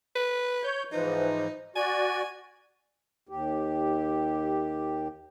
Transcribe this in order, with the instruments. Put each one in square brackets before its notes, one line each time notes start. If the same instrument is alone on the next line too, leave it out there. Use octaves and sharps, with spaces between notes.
[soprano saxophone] B4
[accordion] C#5 G6
[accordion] G#2 E3 F3 [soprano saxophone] D#4
[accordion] F#4 D5 [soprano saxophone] G#5
[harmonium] D#2 G4